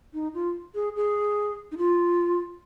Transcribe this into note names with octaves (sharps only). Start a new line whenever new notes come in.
D#4
F4
G#4
G#4
D#4
F4